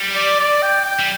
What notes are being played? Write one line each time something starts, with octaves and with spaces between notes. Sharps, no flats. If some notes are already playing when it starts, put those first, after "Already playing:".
Already playing: G3
D5
D5
G5
G5
G3